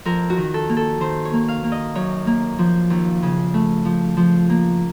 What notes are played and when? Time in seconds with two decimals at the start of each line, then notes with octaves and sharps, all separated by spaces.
0.05 F2 A#4
0.30 F#4
0.37 D#3
0.54 A4
0.69 A#3
0.77 A4
1.00 D#3 C5
1.25 C#5
1.33 A#3
1.48 F5
1.64 A#3
1.72 D#5
1.95 F#2 C#5
2.27 A#3
2.59 F3
2.90 D#2
3.23 C#3
3.54 A3
3.85 F3
4.17 F3
4.49 A#3